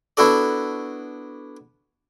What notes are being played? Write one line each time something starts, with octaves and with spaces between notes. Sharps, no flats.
B3 D4 E4 F#4 A4 D5